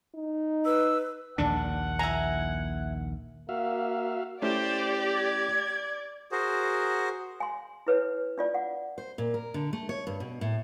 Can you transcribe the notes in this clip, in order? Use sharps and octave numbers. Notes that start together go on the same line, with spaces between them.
D#4
B4 E6
A#1 D#2 D#3 D4 F#5
E4 G#5 A#5
A#3 F#4 E5 F5
A3 C#4 E4 G4 C5 D5
G#6
F#4 G#4 A#4 C5
G#5 C6
E4 B4 C#5
D4 F4 D5
F#5
C5
A#2
A#4
D3
A3
C#5
G2
B2
A2